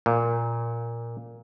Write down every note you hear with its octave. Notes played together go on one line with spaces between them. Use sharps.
A#2